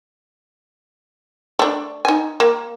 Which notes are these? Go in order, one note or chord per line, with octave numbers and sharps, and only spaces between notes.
A3 D4
D#4 G#5
A#3